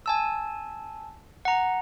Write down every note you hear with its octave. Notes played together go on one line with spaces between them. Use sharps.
G#5 A5 E6
F#5 A#5